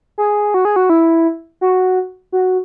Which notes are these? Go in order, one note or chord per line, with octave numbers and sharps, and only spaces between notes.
G#4
F#4
G#4
F#4
E4
F#4
F#4